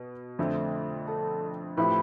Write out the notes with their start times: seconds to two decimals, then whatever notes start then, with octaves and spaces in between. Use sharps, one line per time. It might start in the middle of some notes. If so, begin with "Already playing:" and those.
Already playing: B2 B3
0.39 F2 D3 A3 C4
1.07 A4 A5
1.77 A2 F3 C4 E4 G4 B4 B5